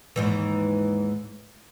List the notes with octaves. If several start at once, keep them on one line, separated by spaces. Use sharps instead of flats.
D#2 G#2 E3